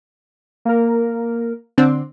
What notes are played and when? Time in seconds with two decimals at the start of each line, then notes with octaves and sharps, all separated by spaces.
0.65 A#3 A#4
1.78 D3 C4 D4